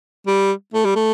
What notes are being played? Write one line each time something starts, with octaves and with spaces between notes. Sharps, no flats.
G3
A3
G3
A3